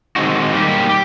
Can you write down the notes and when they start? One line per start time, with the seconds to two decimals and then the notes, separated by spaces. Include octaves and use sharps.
0.16 D#3 G#3 C4 D#4 F#4
0.53 G3 A#3 D#4 G4
0.89 G4